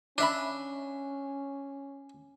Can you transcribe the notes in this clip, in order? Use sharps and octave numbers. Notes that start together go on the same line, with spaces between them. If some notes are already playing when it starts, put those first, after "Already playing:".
C#3 C#4 D4 E5 B5